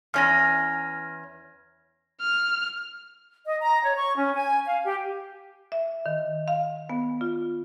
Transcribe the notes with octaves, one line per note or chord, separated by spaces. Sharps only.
E2 C#4 F6 A#6
F6
D#5
A#5
C#5
C#6
C#4
G#5
F5
G4
E5
D#3
F5
B3
F4